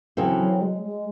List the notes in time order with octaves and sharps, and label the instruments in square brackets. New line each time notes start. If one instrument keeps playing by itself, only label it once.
[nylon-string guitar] C#3 E3 C4 F#4 A4 [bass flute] F#3
[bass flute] F#3
G#3
G#3